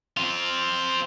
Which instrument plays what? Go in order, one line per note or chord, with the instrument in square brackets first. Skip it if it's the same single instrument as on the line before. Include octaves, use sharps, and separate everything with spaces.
[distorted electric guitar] C4 F4